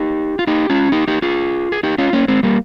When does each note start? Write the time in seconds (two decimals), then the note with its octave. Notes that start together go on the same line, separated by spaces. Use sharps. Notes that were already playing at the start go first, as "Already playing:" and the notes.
Already playing: D#4 G4
0.39 F4
0.47 D#4 G4
0.70 C#4 F4
0.92 D#4 G4
1.08 D#4 G4
1.22 F4 G#4
1.72 G#4
1.83 D#4 G4
1.98 C#4 F4
2.13 A#3 C#4
2.28 G#3 C4
2.43 G3 A#3